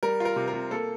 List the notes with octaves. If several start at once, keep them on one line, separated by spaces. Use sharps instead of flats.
G3 A#4
F4 A#4
C3
A#4
C3
A#3 A4